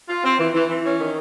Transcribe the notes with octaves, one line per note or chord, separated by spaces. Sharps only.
F4
C4
E3
E3
E3
C#4
D#3